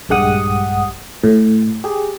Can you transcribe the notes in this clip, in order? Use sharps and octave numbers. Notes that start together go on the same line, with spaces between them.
A#1 G2 G#3 G4 F#5 D#6
A2
G4 G#4